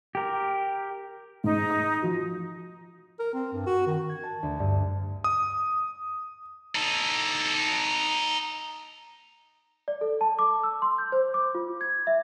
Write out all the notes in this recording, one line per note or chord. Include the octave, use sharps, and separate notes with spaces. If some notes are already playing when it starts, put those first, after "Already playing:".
G4 A#4
G#2 D#4
D#6
F3 F#4
A#4
C4
G2
F#4
D#3
G#6
A5
D2
G2
D#6
D#4 A4
D5
A4
A5
D6
E6
C6
G6
C5
D6
F4
G#6
E5